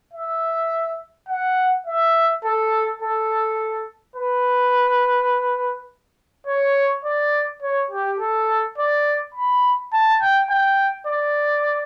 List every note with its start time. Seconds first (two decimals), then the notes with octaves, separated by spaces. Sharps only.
0.14 E5
1.29 F#5
1.87 E5
2.44 A4
3.02 A4
4.16 B4
6.47 C#5
7.05 D5
7.62 C#5
7.91 G4
8.19 A4
8.78 D5
9.35 B5
9.93 A5
10.22 G5
10.51 G5
11.07 D5